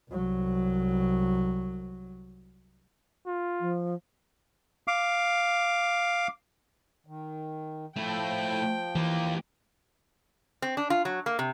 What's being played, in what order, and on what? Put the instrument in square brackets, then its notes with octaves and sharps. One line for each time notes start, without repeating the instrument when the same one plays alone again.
[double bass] C2 F#3
[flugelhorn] F4
[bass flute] F3
[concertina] F5 D6
[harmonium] D#3
[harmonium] F3 [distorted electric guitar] A3 E4 [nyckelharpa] G5
[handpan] E3 [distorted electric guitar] A#3 G4
[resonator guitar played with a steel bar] C4
D4
F4
F#3
A#3
C3